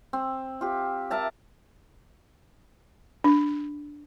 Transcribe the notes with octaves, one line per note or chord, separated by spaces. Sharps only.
C4
F4 G4
A#4 E5 A5 A#5
D4